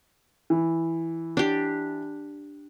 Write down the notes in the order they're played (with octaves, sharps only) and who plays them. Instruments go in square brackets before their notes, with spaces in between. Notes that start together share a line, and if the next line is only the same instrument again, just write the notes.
[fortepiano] E3
[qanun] D4 G4